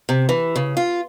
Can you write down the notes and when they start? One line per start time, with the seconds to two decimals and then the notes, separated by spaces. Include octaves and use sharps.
0.09 C3
0.29 E3
0.56 C#3
0.77 F4